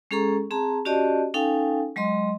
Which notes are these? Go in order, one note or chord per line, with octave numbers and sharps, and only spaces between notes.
G#3 C#4 G#4 A4 A#5 C#6
C4 G#4 A5 A#5
C#4 F#4 G4 D5 D#5 A5
C#4 D#4 A4 F5 G5 G#5
F#3 G#3 D#5 C6